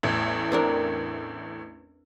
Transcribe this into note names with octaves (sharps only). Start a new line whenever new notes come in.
A1 E2 A2
C4 D4 A#4